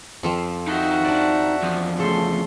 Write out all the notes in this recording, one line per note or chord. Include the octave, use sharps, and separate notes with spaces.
F2 F3 C4
D#4 F#4 E5 G5
D4 D5
E2 F3
C#3 A3 A4 C6